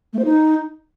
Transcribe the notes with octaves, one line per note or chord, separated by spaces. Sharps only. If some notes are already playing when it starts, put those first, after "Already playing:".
A3
C5
D#4